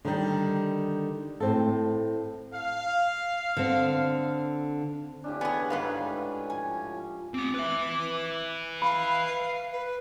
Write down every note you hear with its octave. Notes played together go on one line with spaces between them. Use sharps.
D3 D#3 G3
A2 C4 A4
F5
D3 C4
A2 C#4 D4 F4 G4
B3 G#4 G#5
G#2 B4 F5
F3 G#5
C4 F#5 D6
B4 E5
F5 B5
B4